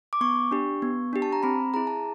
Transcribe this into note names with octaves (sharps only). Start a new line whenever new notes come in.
D6
B3 C#6
D4 G4
B3
D4 G4
A5
A#5
C4 B5
E4 G#4 A#5
A5